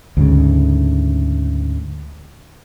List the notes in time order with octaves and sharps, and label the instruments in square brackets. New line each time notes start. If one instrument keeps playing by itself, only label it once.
[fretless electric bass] D2 G#2 C#3